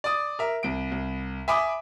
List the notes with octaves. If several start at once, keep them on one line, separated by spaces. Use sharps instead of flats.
D5 D#6
A#4 E5
C2 D7
C2
E5 G#5 B5 D6 D#6